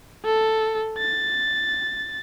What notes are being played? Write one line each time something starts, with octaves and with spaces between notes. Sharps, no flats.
A4
A6